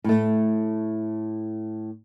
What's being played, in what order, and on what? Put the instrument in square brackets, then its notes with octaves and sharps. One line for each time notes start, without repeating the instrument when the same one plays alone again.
[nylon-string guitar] A2 A3